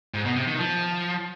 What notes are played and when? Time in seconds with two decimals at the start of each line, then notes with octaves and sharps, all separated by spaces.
0.14 G#2
0.25 B2
0.36 C3
0.47 D#3
0.58 F3